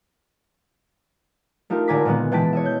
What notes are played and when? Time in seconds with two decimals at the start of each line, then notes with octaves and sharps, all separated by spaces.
1.70 A3 D#4 F4 G4 A#4
1.88 G#1 D3 G#5 A#5 D6 B6
2.05 A#2 D3 D#3 G#3 B3
2.32 B2 E3 G#3 G5 A5 B6
2.53 C#5 D#5 E5
2.65 G6